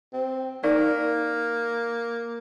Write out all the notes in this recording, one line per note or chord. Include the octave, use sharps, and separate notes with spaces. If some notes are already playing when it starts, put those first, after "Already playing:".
C4
A#3 D#4 A#4 D5